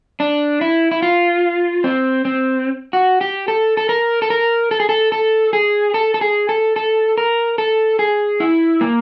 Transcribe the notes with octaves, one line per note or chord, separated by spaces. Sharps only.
D4
E4
E4
F4
C4
C4
F#4
G4
A4
A4
A#4
A4
A#4
A4
G#4
A4
A4
G#4
A4
A4
G#4
A4
A4
A#4
A4
G#4
E4
A#3